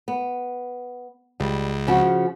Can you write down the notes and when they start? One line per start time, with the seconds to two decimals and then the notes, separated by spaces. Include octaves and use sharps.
0.08 B3
1.40 C#2 G3
1.87 C#3 F3 F#4